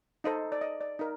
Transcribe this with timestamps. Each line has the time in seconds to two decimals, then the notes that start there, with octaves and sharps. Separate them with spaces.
0.24 D#4 A4 C5 D#5
0.52 D5
0.61 D#5
0.81 D5
0.99 D#4 A#4